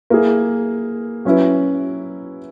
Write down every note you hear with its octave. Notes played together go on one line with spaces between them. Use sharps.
A#3 E4 G#4
F#3 C#4 E4 B4